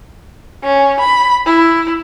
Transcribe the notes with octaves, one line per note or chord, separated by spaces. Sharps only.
C#4
B5
E4